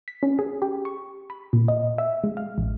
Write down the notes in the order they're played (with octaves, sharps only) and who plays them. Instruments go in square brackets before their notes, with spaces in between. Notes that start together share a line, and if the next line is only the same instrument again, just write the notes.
[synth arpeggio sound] B6
C#4
G#4
G4
C#6
B5
A#2
D#5
E5
G#3
F5
A1